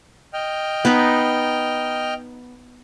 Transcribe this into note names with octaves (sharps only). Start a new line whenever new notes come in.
D#5 G5 F6
B3 D#4 B4